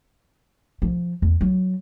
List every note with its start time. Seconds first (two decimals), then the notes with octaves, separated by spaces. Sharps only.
0.82 F3
1.22 E2
1.41 F#3